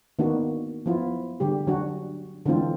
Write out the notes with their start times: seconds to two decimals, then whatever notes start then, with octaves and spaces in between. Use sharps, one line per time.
0.19 D#3 A#3 B3 D4 F#4
0.86 F3 F#3 B3 E4 F4
1.40 D3 G3 G4
1.67 D3 F#3 D4 F#4
2.46 D3 E3 G#3 C4 F4 A4